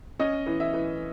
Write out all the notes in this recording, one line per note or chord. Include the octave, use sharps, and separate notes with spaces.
C#4 D#5
E3
E5
E3